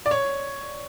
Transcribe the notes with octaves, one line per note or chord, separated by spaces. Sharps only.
D5
C#5